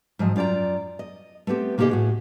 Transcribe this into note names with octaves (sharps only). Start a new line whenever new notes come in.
G#2 F3 F#3 D#5
F#2 F4 D5 G5 A#5
D#5
A3 B3 C4 G4
C3 A#3 D#4 G4 G#4 D#5
A2 F#4 G#4